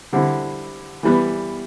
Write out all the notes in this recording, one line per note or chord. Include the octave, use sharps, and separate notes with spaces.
D3 G3 C4 E4
E3 G3 B3